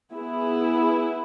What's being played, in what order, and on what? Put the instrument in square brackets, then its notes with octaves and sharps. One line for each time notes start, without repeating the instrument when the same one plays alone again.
[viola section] B3 E4 G#4